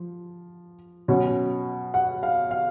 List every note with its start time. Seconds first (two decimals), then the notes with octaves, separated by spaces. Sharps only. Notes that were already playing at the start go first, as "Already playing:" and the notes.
Already playing: F3
1.08 B2 F#3 C#4
1.94 F#5
2.23 F5
2.51 F5